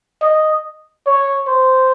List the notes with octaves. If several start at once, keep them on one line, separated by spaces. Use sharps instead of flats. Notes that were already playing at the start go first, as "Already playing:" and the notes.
D#5
C#5
C5